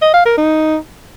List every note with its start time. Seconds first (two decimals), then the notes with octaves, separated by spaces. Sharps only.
0.02 D#5
0.14 F5
0.26 A#4
0.38 D#4